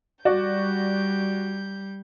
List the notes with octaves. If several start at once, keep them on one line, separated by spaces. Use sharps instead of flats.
G3 F#4 D5 G6